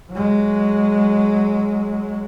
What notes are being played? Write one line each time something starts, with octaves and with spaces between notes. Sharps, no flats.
F#3 G#3